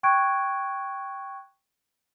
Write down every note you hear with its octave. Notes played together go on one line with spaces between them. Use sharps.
G5 C#6 F#6 G#6 D7